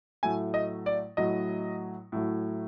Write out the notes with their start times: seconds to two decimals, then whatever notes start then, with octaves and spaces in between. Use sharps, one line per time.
0.23 A2 F#3 A3 G#5
0.54 D#5
0.86 D5
1.17 A2 F#3 A3 D#5
2.12 A2 F#3 A3